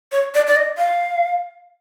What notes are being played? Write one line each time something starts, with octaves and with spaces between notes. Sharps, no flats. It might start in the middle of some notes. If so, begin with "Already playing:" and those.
C#5
D5
D5
D#5
F5